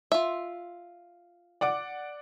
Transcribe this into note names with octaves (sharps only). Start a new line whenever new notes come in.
F4 E5
D5 F#5 D6